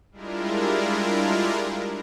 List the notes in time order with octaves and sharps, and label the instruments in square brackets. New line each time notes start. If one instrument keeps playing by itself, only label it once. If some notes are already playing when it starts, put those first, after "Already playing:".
[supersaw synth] G3 G#3 D4 E4 F4 A#4